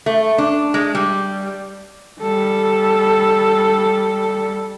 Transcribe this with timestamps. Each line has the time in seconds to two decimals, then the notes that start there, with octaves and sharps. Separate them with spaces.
0.06 A3
0.38 D4
0.74 G#3
0.95 G3
2.21 G3 A4